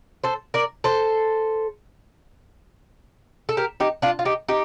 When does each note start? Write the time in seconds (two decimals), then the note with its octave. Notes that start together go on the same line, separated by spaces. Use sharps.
0.24 A4 C5
0.54 A#4 D5
0.84 A4 C5
3.49 A4
3.57 G4 A#4
3.80 D#4 G4
4.02 D4 F4
4.19 F4
4.25 D#4 G4
4.48 D#4 G4